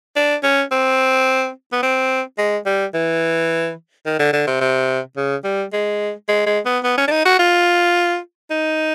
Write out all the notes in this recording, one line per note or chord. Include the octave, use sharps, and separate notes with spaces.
D4
C#4
C4
B3
C4
G#3
G3
E3
D#3
D3
D3
C3
C3
C#3
G3
G#3
G#3
G#3
B3
B3
C#4
D4
D#4
F#4
F4
D#4